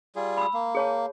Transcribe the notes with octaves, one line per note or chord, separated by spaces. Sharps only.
G3 F4 G#4
B5 E6
A#3
G#4 C#5 A5